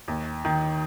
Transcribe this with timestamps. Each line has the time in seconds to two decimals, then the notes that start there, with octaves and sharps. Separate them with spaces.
0.08 D#2
0.45 D#3